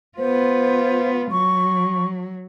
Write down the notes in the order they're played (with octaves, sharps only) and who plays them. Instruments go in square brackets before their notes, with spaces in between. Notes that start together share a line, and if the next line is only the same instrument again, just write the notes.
[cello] B3 F4 [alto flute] C5
[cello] F#3 [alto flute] C#6